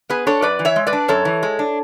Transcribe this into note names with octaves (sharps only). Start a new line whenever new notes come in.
B3 G#4 B4
D4 A4 C#5
F#2 B4 D5
E3
C#5 E5
G#3
B4 D5
D4
F#2 A4 C#5
E3
G#3
D4